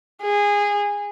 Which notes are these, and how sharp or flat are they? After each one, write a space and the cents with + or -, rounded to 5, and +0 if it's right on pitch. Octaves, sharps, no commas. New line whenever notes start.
G#4 -20